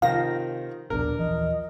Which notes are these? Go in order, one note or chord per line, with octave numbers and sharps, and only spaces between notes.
C3 D#3 F3 F5 A#6
D#1 A#1 B2 D4 A#4
D#1 E3 F3 D#5